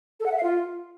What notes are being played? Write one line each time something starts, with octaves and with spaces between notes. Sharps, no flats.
A4
F#5
E5
F5
F4